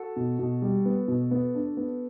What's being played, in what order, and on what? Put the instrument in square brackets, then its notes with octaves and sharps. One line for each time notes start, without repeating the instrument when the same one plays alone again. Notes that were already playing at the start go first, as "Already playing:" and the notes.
Already playing: [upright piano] F#4 A4
[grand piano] B2
B2
G3
B3
B2
B3
D4
B3